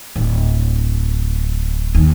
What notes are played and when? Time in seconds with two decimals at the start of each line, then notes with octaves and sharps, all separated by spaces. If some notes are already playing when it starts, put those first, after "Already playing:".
0.16 D1
1.95 D#2